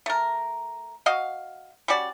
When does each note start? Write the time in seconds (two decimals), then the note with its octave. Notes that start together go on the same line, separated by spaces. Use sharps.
0.06 A3 A#4
1.06 F#4 D#5 F5
1.88 G3 C#4 F#4 D5